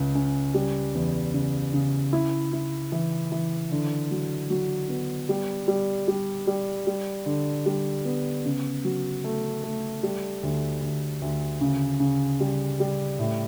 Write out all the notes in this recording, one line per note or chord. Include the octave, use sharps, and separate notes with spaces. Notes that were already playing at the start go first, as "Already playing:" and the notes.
Already playing: C#2 C#4
C#4
G3
E2
C#3
C#3
E4
E4
E3
E3
D3
F#3
F#3
B3
G3
G3
G3
G3
G3
D3
G3
B3
C#3
F#3
A3
A3
G3
D2
D2
D2
C#3
C#3
G3
G3
A2